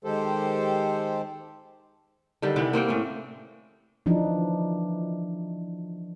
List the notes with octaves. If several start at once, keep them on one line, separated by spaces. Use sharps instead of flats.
D#3 G#3 G4 A4 C5
D3 D#3 G3
C3 E3 B3
A#3 C4 F#5 G5
A2 C#4
E3 F3 D4 D#4